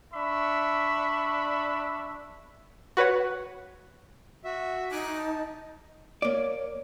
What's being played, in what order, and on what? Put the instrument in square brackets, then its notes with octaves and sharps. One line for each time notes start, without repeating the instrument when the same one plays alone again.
[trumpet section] D4 E5 B5 C#6
[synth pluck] F#4 B4 C#5 F#5
[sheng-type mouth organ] F#4 E5
[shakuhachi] D#4 [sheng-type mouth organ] G#5 D6 F#6
[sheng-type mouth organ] A5
[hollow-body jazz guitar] A#3 D5 [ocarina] C#5